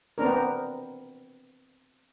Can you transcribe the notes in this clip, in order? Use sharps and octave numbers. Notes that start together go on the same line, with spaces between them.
B3 C4 D4 A#4